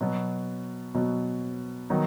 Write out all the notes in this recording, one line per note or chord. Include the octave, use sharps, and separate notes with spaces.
B2 F#3 B3
B2 F#3 B3
D#3 F#3 B3 D#4